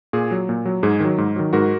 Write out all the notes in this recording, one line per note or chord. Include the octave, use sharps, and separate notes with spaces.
A#2 G#4
F#3
A#2
F#3
G#2 G#4
D#3 F#3
G#2
D#3 F#3
G#2 F#4 A#4